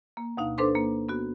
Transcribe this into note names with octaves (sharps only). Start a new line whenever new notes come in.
A#3
D2 B2 D#4 F5
D4 A4 B4 C5 C6 D6
A#3
B3 F#4